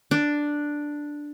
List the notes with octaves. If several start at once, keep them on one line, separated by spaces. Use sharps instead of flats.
D4